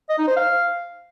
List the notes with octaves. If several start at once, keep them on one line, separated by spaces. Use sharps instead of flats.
D#5
D#4
C5
F5